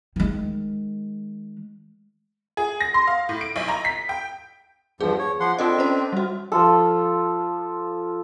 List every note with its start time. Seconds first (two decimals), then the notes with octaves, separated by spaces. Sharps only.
0.16 D#3 G#3
2.57 G#4
2.81 A#6
2.94 C6
3.07 F5
3.29 A2
3.41 D7
3.56 B1
3.68 A#5
3.85 B6
4.09 G5
5.01 E2 G2 F3 G#4
5.19 C#5
5.40 F3 F#5 C6
5.59 C4 D4 F4 A4 D#5
5.78 C#4 C5
6.13 G3 F#4
6.52 F3 F4 A4